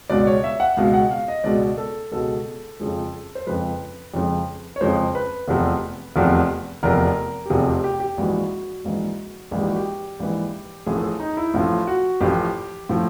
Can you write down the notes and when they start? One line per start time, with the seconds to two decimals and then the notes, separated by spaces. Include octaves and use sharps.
0.10 C#2 B2 G#3 D5
0.27 C#5
0.44 E5
0.60 F#5
0.77 C#2 B2 G#3 F5
0.94 F#5
1.11 F5
1.28 D#5
1.44 C#2 B2 G#3 D5
1.78 A4
2.11 C#2 B2 G#3 A4
2.80 F2 C#3 F3 G#3
3.35 C5
3.47 F2 C#3 F3 G#3 B4
4.14 F2 C#3 F3 G#3
4.76 C#5
4.81 F2 C#3 F3 G#3 C5
5.15 B4
5.48 F1 E2 C3 F3
6.16 F1 E2 C3 F3
6.83 F1 E2 C3 F3 A#4
7.46 G4
7.50 F1 E2 C3 F3 G#4
7.67 G4
7.84 G4
8.00 G4
8.17 A#1 G#2 E3 F#4
8.85 A#1 G#2 E3
9.51 A#1 G#2 E3 G#4
9.60 G4
9.68 F#4
9.76 G4
10.19 A#1 G#2 E3
10.86 A1 A2 F3 G#4
10.98 A4
11.03 G#4
11.20 D#4
11.37 E4
11.54 A1 A2 F3 F4
11.87 F#4
12.20 A1 A2 F3 G4
12.89 A2 F3